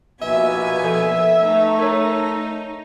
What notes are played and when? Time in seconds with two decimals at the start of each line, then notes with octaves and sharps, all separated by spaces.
0.22 A#1 D#2 B2 B3 E5 G#5
0.84 F3 A4
1.41 A3 D#4
1.79 A#4 C#5